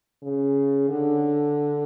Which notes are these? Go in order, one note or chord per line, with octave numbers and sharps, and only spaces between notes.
C#3
D3